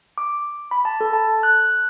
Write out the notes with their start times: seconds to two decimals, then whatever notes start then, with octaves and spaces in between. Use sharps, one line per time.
0.18 D6
0.71 B5
0.85 A5
1.01 A4
1.13 A5
1.43 F#6